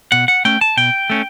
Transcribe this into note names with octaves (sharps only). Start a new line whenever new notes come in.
B2 F#5
F#5
A3 C#4 G5
A5
B2 G5
A3 C#4